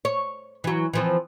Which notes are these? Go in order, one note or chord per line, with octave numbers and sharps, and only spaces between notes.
C#5
E3 F#3
E3 F3 C4